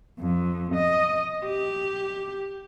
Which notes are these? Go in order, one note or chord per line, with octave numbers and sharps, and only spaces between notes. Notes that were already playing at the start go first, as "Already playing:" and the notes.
F2
D#5
G4